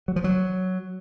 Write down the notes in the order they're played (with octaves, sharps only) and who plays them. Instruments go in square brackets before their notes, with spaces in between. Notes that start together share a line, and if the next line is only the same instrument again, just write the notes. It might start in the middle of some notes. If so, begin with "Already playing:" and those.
[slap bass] F#3
F3
F#3